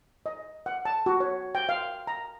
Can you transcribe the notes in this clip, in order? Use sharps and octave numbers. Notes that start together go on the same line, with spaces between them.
D#5
F#5
A5
F#4
C#5
G5
F5
A#5